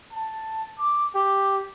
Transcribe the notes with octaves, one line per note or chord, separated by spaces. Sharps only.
A5
D6
G4